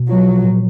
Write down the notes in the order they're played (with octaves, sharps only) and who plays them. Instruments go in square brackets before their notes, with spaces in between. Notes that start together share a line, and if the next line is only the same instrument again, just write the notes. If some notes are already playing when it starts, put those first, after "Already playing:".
Already playing: [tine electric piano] B2
[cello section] F#3 [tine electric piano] F4
[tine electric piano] F3
A#2